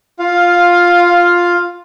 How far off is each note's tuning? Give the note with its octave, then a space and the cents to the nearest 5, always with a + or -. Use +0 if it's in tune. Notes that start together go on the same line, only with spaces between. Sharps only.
F4 +0 F5 +10